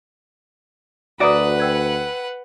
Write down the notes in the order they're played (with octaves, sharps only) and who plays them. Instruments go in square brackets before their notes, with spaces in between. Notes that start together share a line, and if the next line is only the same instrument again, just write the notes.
[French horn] D2 [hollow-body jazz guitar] F#4 D5 [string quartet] B4 F#5 [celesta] E5 A#5 D#6
[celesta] G5 E6 G#6